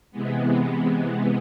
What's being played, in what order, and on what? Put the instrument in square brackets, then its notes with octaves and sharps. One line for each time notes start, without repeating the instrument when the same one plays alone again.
[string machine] C3 E3 G#3 B3